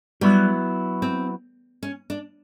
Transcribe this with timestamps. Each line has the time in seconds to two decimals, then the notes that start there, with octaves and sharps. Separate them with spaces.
0.21 F#3 G3 B3 E4
1.02 C4
1.83 C#4
2.10 D4